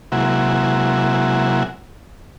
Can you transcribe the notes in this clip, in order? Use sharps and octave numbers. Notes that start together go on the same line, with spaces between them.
C3 F#3 G#3 A#3 E4 F#4